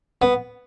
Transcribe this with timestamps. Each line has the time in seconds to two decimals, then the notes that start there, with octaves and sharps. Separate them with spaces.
0.22 B3